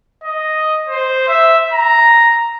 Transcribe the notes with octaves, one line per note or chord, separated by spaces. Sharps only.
D#5
C5
E5
A#5